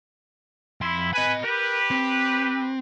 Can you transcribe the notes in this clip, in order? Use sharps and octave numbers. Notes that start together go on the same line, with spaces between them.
F2 E4 C6
B4 D#5 G#5 B5
G4 A#4 B4
C4